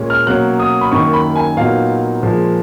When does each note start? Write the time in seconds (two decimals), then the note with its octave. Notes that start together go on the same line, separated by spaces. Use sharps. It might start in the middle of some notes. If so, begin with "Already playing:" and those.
Already playing: A#2 G#3 C#4
0.10 F6
0.27 B2 F#3 A#3 C#4 F#6
0.60 D#6
0.81 B5
0.91 F#2 D#3 A#3 C#6
1.13 B5
1.36 G#5
1.57 A#2 F#3 B3 D#4 F5
2.22 A#2 F3 G#3